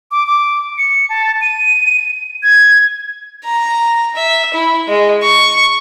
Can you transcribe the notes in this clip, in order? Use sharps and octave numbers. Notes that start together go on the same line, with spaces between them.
D6
D6
C#7
A5
D#7
G#6
A#5
E5
E4
G#3
C#6